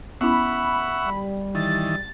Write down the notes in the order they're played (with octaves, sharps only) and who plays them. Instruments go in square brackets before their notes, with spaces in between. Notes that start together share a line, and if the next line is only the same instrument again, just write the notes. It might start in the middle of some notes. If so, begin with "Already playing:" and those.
[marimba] B3 C#4 E4 [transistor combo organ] E5 F#5 C#6 [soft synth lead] B5
[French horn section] G3
[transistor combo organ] D#3 E3 [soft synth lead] A6